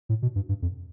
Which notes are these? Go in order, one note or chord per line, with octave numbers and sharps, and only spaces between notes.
A2
B2
G2
G2
F2